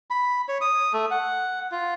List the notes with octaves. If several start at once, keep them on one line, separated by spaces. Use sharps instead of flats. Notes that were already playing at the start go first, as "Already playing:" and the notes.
B5
C#5
D#6
A3
F#5
F4